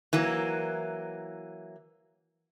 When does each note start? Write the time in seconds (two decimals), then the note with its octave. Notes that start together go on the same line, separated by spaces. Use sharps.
0.13 E3 F#3 A#3